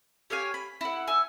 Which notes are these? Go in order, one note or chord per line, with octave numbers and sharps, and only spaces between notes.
G4 C#5 F5 G#5
B5
E4 F#5
G#5 E6